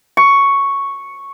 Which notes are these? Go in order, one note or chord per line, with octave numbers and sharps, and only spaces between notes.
C#6